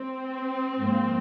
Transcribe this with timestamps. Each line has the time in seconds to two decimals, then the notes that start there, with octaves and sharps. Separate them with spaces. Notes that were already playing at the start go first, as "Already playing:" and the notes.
Already playing: C4
0.78 G#2 F3 A#3